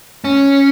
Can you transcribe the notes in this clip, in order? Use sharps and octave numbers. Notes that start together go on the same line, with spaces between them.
C#4